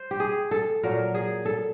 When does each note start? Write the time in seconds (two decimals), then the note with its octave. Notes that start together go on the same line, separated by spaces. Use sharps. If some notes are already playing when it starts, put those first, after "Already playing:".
Already playing: C5
0.11 G4
0.20 G#4
0.51 A4
0.83 A#2 F#3 A#4
1.14 G#4
1.46 A4